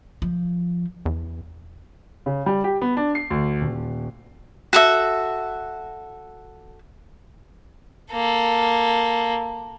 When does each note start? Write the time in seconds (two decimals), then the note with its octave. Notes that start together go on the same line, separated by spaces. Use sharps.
0.22 F3
1.05 E2
2.26 C#3
2.46 G3
2.64 G4
2.81 B3
2.97 D4
3.15 C7
3.30 D2
3.61 D#1
4.73 F#4 A4 E5
8.12 A#3 A4